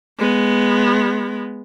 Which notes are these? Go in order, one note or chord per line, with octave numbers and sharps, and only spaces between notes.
G#3 B3